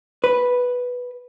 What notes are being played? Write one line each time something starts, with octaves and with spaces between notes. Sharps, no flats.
B4